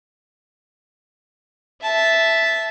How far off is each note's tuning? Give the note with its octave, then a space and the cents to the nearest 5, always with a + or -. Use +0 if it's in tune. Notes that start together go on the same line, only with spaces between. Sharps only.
E5 +0 A5 -10